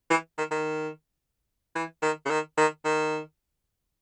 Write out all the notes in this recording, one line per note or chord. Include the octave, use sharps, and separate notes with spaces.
E3
D#3
D#3
E3
D#3
C#3
D#3
D#3
D#3